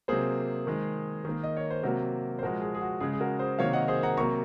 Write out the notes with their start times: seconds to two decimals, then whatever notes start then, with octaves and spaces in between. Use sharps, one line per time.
0.08 C3 F#3 A#3 G#4 C5
0.67 D#3 G#3
1.25 D#3 A#3
1.44 D#5
1.57 C#5
1.70 C5
1.83 C3 F#3 A#3 F#4 A#4
2.39 C5
2.43 A#2 F3 G#3 F#4 A#4
2.62 G#4
2.75 G#4
2.81 F#4
3.00 C#3 G#3 G#4
3.13 G#4
3.20 F#4 A#4
3.39 G#4 C5
3.59 C3 D#3 F#3 A#3 C#5 F5
3.73 D#5 F#5
3.88 G#4 C5
4.03 F#5 A#5
4.17 C3 F#3 A#3 A#5 C#6